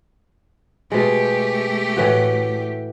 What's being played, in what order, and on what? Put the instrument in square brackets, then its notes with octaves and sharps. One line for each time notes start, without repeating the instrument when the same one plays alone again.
[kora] B2 G#3 [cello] A3 G4
[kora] A2 E3 F#4